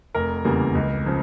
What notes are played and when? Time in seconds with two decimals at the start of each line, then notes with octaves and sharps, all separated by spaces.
0.15 F1 A#4
0.45 E2 C#3 G3 A#3
0.75 C#2
1.06 C#3 F3